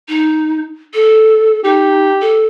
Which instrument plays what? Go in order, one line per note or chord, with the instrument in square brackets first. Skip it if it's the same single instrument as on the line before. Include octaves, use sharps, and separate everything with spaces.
[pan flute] D#4
A4
[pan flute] D#4 [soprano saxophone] G4
[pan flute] A4